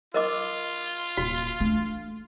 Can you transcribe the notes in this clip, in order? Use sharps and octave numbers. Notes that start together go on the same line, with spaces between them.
F4 A#4 D#5 D6
D#1 F#4
A3 D4